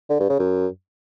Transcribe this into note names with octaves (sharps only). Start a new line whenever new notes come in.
D3
G2
C#3
F#2